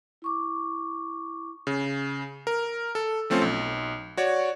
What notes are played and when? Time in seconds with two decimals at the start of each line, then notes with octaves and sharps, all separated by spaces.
0.22 E4 C#6 D6
1.67 C#3
2.47 A#4
2.95 A4
3.30 F3 A3 C4 C#4 F4
3.42 B1
4.17 F#4 C#5 D5